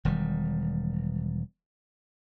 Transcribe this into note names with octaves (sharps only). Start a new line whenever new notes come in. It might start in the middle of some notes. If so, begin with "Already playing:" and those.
E1 D#3 G3